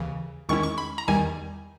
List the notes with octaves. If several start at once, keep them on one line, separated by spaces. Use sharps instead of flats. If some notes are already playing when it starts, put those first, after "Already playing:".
Already playing: D#2 C#3 E3
E2 D#3 G#3 C#4 E4 C#6
C#6
B5
A#5
E2 D#3 G3 G#5